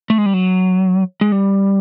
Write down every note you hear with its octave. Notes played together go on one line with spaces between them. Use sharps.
A3
G#3
G3
F#3
G#3
G3